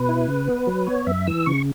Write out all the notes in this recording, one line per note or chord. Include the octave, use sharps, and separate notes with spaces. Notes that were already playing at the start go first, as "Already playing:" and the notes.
Already playing: B2 B4
E4
C#3
B3
F#3
B3 C#5
F#2 E5
E3 E6
C#3 C#6